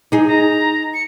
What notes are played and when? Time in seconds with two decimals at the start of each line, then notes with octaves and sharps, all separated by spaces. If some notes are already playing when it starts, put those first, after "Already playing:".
0.12 D#4 G#4
0.27 A#5
0.94 C#7